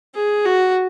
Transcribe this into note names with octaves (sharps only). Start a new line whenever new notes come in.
G#4
F#4